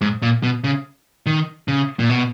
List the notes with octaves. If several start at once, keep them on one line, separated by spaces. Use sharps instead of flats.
G#2
A#2
B2
C#3
D#3
C#3
A#2
B2